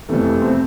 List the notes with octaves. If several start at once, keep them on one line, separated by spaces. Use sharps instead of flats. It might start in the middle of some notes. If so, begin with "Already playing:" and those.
F2 C3 E3 A3
C4